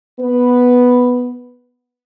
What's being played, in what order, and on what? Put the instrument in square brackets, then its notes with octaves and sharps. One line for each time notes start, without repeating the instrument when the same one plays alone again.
[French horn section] B3 B4